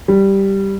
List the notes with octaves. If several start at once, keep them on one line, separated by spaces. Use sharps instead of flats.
G3